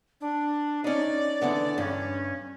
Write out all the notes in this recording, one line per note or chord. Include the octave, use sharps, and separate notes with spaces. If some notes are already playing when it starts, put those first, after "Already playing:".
D4
C#4 D#4 D5
D3 E3 B3
G2 C#4